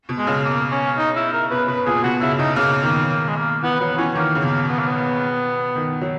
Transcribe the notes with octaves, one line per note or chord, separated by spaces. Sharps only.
B2
G#3
C#3
A#3
C#4
D#4
E4
A#4
B2 B4
B2 B4
A#2 G#4
B2 F#4
C#3 E4
B2 D#4
C#3 A#3
D#3 A#3
A#3
G#3
A#3
E3 B3
F#3 B3
E3 C#4
D#3 A#3
C#3
B2 A#3
B3
A#3
B3
D#3
F#3